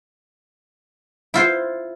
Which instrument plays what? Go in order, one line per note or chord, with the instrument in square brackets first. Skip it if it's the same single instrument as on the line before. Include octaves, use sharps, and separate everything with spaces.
[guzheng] E4 F4 C5